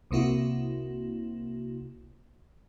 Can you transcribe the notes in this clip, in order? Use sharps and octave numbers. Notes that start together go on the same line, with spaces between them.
C2 C3 A#3 E4 F#4